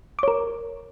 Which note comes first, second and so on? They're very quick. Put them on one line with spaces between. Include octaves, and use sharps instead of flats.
D6 C#5 A#4